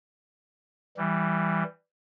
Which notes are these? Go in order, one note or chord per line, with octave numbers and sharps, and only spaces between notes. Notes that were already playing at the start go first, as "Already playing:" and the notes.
E3 G3